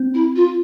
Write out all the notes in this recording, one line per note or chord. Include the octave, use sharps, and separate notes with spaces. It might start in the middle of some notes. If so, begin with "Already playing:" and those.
Already playing: C4
E4
F4